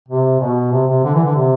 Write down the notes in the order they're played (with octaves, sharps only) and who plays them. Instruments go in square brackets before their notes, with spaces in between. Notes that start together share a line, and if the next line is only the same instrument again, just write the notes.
[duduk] C3
B2
C3
C3
D3
E3
D3
C3